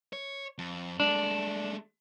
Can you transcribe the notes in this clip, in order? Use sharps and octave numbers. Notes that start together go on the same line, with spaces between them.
C#5
F2
G#3 A3 D4